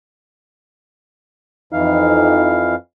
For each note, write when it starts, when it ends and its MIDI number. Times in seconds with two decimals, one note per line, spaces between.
1.73 2.75 41
1.73 2.75 52
1.73 2.70 63
1.73 2.75 77